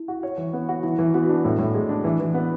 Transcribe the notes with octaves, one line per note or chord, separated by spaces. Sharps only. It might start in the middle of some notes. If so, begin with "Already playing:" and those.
Already playing: E4
F#4
C#5
E3
B3
F#4
E3 E4
E3
B3 F#4
D4
A2
A2
G#3
D4
E3
E3
B3